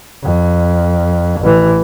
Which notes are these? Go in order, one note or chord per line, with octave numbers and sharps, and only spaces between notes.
F2
A1 E3